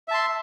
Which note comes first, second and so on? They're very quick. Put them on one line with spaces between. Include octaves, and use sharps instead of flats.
E5 A5 C6